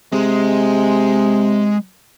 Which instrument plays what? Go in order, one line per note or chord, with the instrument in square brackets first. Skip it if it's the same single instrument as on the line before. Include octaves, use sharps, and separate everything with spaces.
[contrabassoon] C3 [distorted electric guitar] G#3